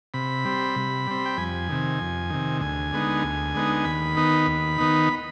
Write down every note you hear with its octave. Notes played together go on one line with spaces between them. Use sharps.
C3 B5
G3 C4
C3
G3 C4
G5
F2 G#5
C3 D#3
F2
C3 D#3
D2 G#5
D3 G#3 B3 D#4
D2
D3 G#3 B3 D#4
D#2 B5
D#3 B3 D#4
D#2
D#3 B3 D#4